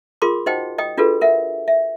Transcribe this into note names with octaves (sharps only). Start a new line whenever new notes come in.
F4 G#4 A#4 C6 D6
D#4 F#4 C5 D#5 F#5 G5
D#5 G5 D#6
D4 F4 F#4 G#4 A4 B4
A#4 E5 F#5
E5